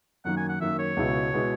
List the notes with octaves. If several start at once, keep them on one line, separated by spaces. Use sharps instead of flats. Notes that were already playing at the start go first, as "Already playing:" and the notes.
F#2 D#3 A#3 F#5
G#5
F#5
F#2 D#3 A#3 E5
C#5
C#2 B2 G#3 B3 E4
B2 G#3 B3 E4